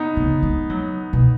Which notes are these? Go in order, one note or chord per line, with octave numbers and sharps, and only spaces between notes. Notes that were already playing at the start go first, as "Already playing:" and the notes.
Already playing: B3 D#4
C#3
G#3
F#3
B2